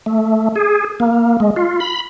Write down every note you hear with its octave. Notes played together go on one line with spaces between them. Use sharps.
A3
G#4
A#3
G#3
F4
B5